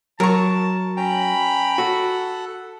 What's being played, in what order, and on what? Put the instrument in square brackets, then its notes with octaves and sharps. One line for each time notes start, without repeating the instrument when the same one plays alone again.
[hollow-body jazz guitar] F#3 [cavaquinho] A#4 C#6 [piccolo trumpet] A5
[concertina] C#4 G5 A#5 [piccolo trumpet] B5
[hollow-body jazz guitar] F#4 [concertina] A4 F#5